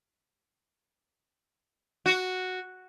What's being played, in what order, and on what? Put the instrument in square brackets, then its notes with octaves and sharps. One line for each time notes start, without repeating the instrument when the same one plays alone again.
[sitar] F#4